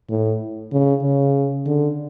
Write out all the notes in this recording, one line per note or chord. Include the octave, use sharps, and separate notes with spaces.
A2
C#3
C#3
D3